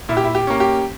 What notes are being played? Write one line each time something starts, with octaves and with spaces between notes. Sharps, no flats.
A#2 E4
G4
E4
G4
A#3 C#4
G4